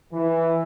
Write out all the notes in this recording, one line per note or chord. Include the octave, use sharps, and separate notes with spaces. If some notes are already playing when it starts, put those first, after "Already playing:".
E3